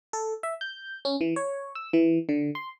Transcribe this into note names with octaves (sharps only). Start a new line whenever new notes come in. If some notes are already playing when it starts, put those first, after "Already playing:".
A4
E5
G6
C#4
E3
C#5
E6
E3
D3
C6